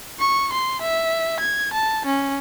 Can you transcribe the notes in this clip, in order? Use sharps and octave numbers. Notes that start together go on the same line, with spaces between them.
C#6
C6
E5
G#6
A5
C#4